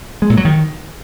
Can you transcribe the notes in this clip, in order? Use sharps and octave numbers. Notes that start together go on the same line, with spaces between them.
G#3
A#2
F#3
D#3